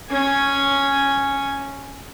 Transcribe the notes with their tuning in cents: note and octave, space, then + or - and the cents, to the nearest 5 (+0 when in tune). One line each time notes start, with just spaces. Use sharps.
C#4 +0 G#5 +0